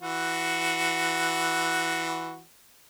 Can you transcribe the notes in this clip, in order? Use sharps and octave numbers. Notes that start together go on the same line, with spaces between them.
E3 F#4